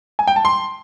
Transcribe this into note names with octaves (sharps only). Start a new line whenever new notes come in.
G#5
G5
A5
C6